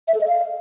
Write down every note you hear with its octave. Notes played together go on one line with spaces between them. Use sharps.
E5
A4
D#5
F5